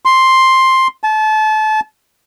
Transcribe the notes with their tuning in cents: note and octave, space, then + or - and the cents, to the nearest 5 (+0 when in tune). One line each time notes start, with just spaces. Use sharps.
C6 +5
A5 -30